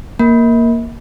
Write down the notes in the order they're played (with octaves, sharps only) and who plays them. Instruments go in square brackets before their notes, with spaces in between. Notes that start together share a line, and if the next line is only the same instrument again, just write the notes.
[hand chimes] A#3